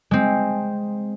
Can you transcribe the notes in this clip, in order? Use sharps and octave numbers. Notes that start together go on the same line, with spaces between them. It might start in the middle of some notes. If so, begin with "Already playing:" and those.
G#3 C4